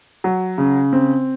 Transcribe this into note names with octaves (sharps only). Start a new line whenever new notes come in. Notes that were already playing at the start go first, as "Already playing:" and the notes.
F#3
C#3
C4